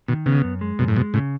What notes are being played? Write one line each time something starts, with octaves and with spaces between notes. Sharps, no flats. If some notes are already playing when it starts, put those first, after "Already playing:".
B2 D#3
C#3 B3
F#2
G#3
F#2 B2
A2
B2 G#3
A2 C#3